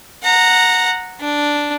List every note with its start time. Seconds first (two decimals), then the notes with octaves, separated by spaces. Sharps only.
0.23 F#5 A#5
1.20 D4